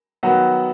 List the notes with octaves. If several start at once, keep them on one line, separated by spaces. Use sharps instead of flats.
D#3 F#3 B3 F#4